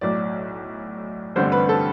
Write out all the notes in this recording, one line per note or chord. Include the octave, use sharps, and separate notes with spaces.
B1 A2 F#3 D5
A1 G2 D3 G3 C4 C5
B4
A4